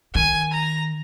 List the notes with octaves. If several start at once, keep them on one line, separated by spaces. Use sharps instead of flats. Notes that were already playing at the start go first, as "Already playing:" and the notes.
D#3 G#5
A#5